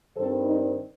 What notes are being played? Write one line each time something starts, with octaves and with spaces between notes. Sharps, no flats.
G2 D#3 G3 C4 A4 C5
D#4